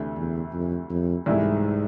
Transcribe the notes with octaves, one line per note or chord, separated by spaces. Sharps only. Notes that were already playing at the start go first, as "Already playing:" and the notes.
Already playing: D2 C3 E3 A3 D4
E2
F2
F2
C2 G#2 C3 E3 A3 E4